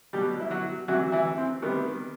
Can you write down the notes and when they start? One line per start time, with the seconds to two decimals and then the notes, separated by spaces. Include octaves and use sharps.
0.13 B2 F#3 G3 G4
0.40 E4
0.51 F#3 F#4
0.88 C3 E3 F#3 G3 F#4
1.12 E3 E4
1.38 C4
1.62 C3 D#3 G3 B3